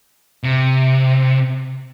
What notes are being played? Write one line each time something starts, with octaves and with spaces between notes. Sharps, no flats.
C3